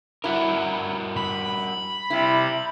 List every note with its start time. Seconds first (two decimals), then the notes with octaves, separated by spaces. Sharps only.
0.24 G3 E4 F#4 A#4
1.17 B5
2.10 C3 G3 E4